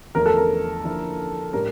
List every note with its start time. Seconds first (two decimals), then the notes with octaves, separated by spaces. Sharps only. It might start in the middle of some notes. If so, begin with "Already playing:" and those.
0.15 E2 D3 F3 A3 D4 A#4
0.26 A4
0.37 A#4
0.83 D3 F3 A#3 E4 A4
1.53 A2 G3 D4 G4 A#4